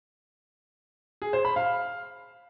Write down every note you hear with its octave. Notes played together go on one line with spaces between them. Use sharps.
G#4
C5
B5
F5